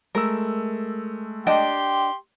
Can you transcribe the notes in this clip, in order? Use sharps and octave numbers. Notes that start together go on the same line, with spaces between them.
G#3 A3 A#4 E6
D4 G4 D#5 G5 C6